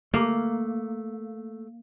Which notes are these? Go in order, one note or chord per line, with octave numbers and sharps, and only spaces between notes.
A3 A#3